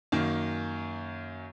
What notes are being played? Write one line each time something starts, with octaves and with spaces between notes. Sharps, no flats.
F#2 D#3 A#3